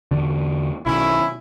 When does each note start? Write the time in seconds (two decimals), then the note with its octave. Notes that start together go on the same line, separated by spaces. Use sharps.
0.11 E2 D3 D4
0.86 B1 D#3 C#4 E4